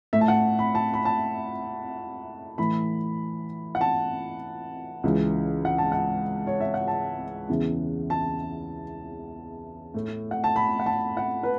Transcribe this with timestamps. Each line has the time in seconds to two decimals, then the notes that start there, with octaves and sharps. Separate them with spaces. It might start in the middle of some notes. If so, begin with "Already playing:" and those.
0.13 A2 A3 E5
0.21 A5
0.28 F#5
0.59 B5
0.75 A5
0.94 B5
1.05 A5
2.58 A2 E3 A3 B5
3.75 F#5
3.81 A5
5.04 C#2 C#3 E3
5.65 F#5
5.78 A5
5.92 F#5
6.47 C#5
6.60 E5
6.74 F#5
6.88 A5
7.49 E2 C#3 E3
8.10 A5
9.94 A2 A3
10.31 F#5
10.44 A5
10.56 B5
10.79 F#5
10.86 A5
11.17 F#5
11.43 B4